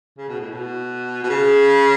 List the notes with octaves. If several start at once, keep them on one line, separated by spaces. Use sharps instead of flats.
C#3
B2
A2
B2
B2
C#3